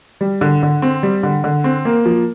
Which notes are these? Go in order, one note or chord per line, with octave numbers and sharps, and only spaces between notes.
G3
D3
D3
C4
G3
D3
D3
C4
A#3
F3